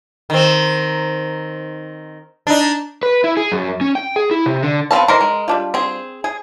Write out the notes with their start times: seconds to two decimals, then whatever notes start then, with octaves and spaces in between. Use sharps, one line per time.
0.30 D#3 C4
2.47 D4 D#4
3.03 B4
3.24 E4
3.37 G#4
3.52 F#2
3.81 C#4
3.95 G5
4.16 G#4
4.31 E4
4.46 C3
4.63 D3
4.91 B3 C4 A4 F5 A5
5.08 E3 A#4 C5 D#5
5.21 G#3
5.48 G3 D4 F4
5.74 C4 G#4
6.24 G#4